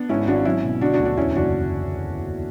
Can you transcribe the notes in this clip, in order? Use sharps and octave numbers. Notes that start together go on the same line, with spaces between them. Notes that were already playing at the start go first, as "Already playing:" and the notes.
Already playing: B3 D4
G#2 C#4 E4
G#1 D4 F#4
F#3 C#4 E4
B2
D3 D4 F#4
D4 F#4
D2
D4 F#4
E2 C#4 E4
F#1 D4 F#4